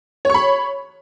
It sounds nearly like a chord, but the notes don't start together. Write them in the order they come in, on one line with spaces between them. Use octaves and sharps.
C#5 C#6 B5